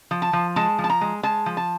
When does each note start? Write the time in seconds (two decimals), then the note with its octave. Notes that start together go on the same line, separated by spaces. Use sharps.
0.11 F3
0.22 A5
0.33 F3
0.56 G#3 A5
0.78 F3
0.84 A5
0.90 A#5
1.01 G#3
1.23 G#3 A5
1.46 F3
1.57 A5